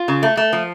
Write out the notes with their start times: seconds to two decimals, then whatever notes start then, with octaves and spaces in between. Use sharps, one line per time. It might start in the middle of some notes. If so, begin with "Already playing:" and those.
Already playing: F4
0.08 C#3
0.23 A3
0.37 A3
0.53 F3